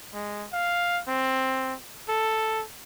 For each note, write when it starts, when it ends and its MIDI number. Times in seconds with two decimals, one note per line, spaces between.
0.14 0.46 56
0.53 1.00 77
1.07 1.74 60
2.09 2.63 69